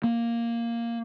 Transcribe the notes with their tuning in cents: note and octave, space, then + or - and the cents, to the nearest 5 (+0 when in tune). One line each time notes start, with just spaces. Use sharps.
A#3 +0